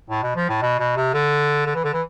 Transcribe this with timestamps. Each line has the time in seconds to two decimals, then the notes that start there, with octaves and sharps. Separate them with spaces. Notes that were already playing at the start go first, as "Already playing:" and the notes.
0.10 A2
0.23 B2
0.36 F3
0.49 A2
0.62 B2
0.80 B2
0.97 C3
1.14 D3
1.66 D3
1.75 E3
1.84 D3
1.93 E3